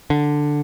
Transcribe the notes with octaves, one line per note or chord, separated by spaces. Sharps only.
D3